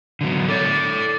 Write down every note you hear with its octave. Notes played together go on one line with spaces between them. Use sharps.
D3 F#3 B3
A4 C#5 D5